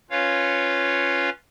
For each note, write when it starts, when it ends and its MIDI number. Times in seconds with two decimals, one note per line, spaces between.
0.11 1.30 61
0.11 1.30 65
0.11 1.30 71
0.11 1.30 73
0.11 1.30 77